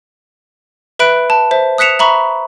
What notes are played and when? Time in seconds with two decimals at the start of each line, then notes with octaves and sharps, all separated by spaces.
0.99 B4 E5 B5 F#6 D7
1.30 A5
1.51 C5 E5
1.78 D#6 F#6 B6 C#7 E7 F7
1.99 E5 A#5 B5 C#6